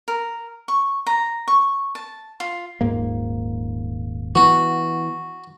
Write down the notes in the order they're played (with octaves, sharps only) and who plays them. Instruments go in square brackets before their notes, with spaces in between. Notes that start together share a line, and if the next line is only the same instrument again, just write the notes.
[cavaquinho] A#4
C#6
A#5
C#6
A5
F4
[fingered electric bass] D#1 G#2 A#3
[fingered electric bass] E3 B3 [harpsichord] F#4